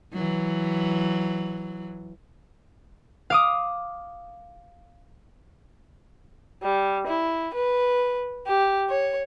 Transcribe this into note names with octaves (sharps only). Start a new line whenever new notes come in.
E3 F#3
F5 D6 D#6
G3
E4
B4
G4
C#5